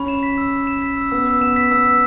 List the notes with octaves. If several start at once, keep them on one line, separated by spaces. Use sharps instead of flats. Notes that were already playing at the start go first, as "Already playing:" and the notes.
Already playing: C#4 B5
E7
B6
E6
B5
E7
B6
E6
B3 E6
E6
B3 E7
B6
B3 E6
E6